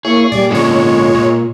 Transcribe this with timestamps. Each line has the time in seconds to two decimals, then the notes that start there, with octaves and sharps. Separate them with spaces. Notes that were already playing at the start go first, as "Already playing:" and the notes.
0.05 A#3 E4 G#4 C#5 C#6
0.32 A#2 G3 D5
0.50 G#2 D3 G#3 C#4 F4 C#5
1.14 A#2